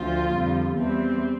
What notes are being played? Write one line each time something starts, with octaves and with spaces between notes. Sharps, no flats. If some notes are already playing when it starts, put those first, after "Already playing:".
Already playing: D2 D3 F3 F4
F2 D3 G3
E2 E3 G3 C4